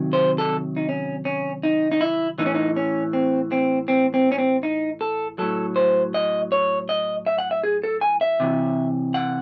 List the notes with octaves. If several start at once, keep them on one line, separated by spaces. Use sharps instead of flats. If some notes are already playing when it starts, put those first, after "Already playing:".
Already playing: C3 D#3 F#3
C5
A4
D#4
C#4
C#4
D#4
D#4
E4
A2 E3 D#4
C#4
D#4
C#4
C4
C4
C4
C4
C#4
C4
D#4
A4
A2 F#3 A4
C5
D#5
C#5
D#5
E5
F#5
E5
G#4
A4
G#5
E5
C3 E3
F#5